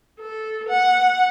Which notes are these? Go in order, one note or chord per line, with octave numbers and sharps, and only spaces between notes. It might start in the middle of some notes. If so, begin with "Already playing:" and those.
A4
F#5